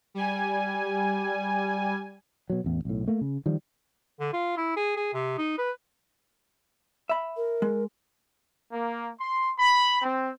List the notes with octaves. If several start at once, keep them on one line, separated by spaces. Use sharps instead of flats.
G3 G#5
B2 F#3
A1 E2
B1 A2
A3 A#3
C#3
D#3 F3 G3
D3
F4
E4
G#4
G#4
C3
D#4
B4
E5 B5
A#4
G#3
A#3
C6
B5
C4